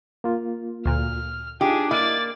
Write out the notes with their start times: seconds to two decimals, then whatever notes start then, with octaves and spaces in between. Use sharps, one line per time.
0.24 A#3 F4
0.86 D2 A#2 F6
1.61 D4 D#4 F4 G4 G#4
1.91 A#3 E4 D5 D#5 A6